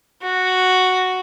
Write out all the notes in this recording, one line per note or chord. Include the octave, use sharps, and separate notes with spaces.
F#4